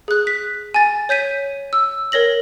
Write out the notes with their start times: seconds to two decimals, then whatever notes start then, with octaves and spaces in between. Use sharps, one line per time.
0.08 G#4 F#6
0.27 B6
0.74 G#5 A6
1.09 C#5 G6 B6 D#7
1.73 E6
2.12 A#4 C#5 A#6 F#7